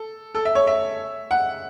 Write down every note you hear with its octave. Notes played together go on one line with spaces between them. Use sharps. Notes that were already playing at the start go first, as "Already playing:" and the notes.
Already playing: A4
A4
E5
C#5
E5
F#5